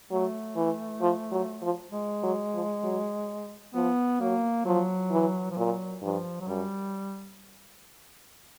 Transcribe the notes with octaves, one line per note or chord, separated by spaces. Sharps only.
F#3 A3
E3
F3
F#3
F3
G#3
F#3
F3
F#3
F3 B3
F#3 A#3
F3 F#3
E3
F3
A#2 F#3
G2 F3
F#3
F#2 G3